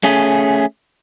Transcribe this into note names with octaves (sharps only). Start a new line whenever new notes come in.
A3 C#4 G#4